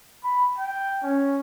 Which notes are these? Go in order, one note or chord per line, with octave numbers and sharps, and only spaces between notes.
B5
G5
C#4